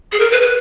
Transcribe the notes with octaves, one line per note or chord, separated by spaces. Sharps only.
G#4
A#4
B4
B4